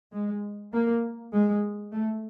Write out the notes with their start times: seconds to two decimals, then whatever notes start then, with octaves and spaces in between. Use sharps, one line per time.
0.11 G#3
0.73 A#3
1.33 G#3
1.94 A3